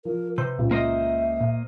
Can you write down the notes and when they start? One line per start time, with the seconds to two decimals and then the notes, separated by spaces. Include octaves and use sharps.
0.05 F3 A#4
0.38 C3 B4 C5 C6 G6
0.59 C#2 A#2
0.71 A#3 C5 D#5 E5
1.41 A#2